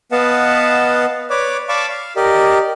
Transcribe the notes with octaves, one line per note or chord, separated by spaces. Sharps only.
B3 B4 D#5 F5 F#5 A5
B4 C#5 D5 D6
D5 F5 A5 B5 C#6 D6
F5
G4 A#4 D5 D#5